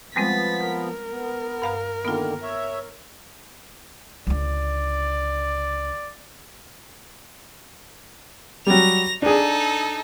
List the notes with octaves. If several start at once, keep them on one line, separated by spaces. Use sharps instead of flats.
F3 G3 G#3 B3 C4 A6 B6
A#4
B3
G2 F5 A#5
D3 D#3 A#3 B3 F4
C#5 E5
C#2 D3 D5
F#3 G3 A#6 F7
D4 D#4 G#4 A4